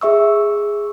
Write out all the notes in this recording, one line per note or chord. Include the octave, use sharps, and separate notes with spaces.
G#4 E5 C#6 E6